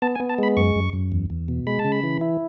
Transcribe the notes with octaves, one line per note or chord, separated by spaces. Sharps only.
B3 A5
G#5
B3
A5
G#3 B5
F#2 C#6
F#2
F#2
E2
E2
B2
G#3 B5
A5
C#3
B5
E3
E4